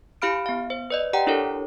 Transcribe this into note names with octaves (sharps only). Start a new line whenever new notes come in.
E4 G4 F5 B5 F6 D7
B3 F5
C5
B4 D5 D#5
G4 D5 F#5 G5 A#5
D4 E4 G4 A4 A#4 C#5